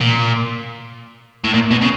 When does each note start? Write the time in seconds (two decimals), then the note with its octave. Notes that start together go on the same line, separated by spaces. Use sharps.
0.01 A#2
1.44 A2
1.54 A#2
1.71 B2
1.82 C#3